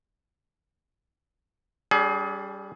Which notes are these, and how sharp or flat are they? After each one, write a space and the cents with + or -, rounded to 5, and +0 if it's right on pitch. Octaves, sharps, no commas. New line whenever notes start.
G3 +0 C#4 +45 G#4 +30